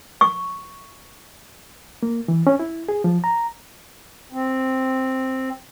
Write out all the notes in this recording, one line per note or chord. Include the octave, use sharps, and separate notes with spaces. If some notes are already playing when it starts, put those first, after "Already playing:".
C#6
A#3
E3
C#4
E4
G#4
F3
A#5
C4